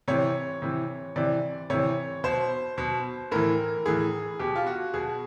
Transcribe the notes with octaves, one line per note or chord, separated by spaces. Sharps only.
C3 E3 C#5
C3 E3
C3 E3 D5
C3 E3 C#5
B2 C5
B2
A2 E3 A#4
A2 E3 G#4
B2 G4
F4
F#4
B2 G#4